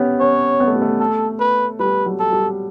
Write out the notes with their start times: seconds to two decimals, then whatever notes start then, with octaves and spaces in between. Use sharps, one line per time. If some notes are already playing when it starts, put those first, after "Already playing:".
Already playing: B3 C#4 G4
0.20 C#4 C#5
0.60 B3
0.68 A3
0.75 G3
0.82 A3
1.00 A4
1.40 B4
1.79 G3 B4
2.06 F#3
2.20 A4
2.33 G3